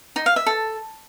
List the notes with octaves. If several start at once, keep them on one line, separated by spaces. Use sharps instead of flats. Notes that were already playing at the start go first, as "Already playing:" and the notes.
D#4
F5
E5
A4